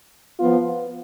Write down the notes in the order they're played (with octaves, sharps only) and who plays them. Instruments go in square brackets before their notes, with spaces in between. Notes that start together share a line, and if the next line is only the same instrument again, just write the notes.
[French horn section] F3 B3 F4